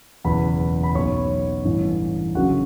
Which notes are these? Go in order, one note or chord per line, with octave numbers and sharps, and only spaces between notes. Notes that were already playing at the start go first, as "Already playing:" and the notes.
F#1 E2 B2 B4 B5
B5
B1 B2 C#5 C#6
A1 G2 E3
F#1 F#2 D3 F#4 F#5